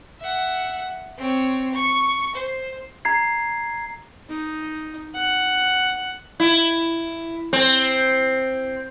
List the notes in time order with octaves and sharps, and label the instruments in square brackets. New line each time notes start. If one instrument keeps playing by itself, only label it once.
[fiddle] E5 F#5
C4 C#5
C#6
C5
[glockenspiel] A#5 G#6 C7
[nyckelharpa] D#4
F#5
[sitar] E4
C4